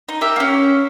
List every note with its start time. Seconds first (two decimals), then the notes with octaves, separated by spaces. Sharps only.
0.09 D#4
0.21 G4 A#4 E5
0.36 A#3 C#4